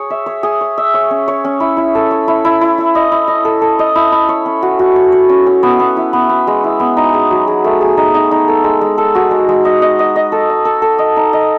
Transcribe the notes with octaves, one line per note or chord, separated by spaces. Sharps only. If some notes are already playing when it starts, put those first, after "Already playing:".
Already playing: G#4 C#5
E5
C#5
G#4
C#5
E5
C#5
C#4
C#5
C#4
E4
E4
A4
C#5
E4
E4
E4
E4
D#5
E4
D#5
A4
A4
D#5
E4
E4
C#5
C#4
F#4
F#4
C#5
C#5
C#4
C#4
B3
B3
E4
B3
B3
G#3
E4
B3
D#4
G#4
F#3
G#4
A3
G#4
D#4
D#4
D#4
A4
G#3
G#3
A4
F#4
G#3
G#3
D#5
D#5
D#5
D#5
A4
D#5
A4
A4
D#5
D#4
D#5